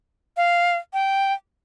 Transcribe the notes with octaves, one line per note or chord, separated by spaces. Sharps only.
F5
G5